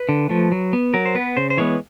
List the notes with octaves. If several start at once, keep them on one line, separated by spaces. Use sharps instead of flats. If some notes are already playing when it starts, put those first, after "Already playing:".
Already playing: B4
D3
F3 A3
F#3
B3
F#3 A#4
C5
B3 B4
C#3 C5
C5
E3 G#3 B3 C#5